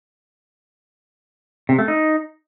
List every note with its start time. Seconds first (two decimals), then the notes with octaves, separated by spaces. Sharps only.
1.69 C3
1.79 A3
1.88 D#4